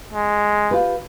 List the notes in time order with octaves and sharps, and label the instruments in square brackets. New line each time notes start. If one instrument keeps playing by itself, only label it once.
[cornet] G#3
[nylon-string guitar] F4 G4 B4